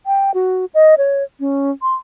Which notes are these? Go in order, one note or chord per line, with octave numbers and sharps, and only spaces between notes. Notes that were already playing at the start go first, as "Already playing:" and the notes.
G5
F#4
D#5
C#5
C#4
C6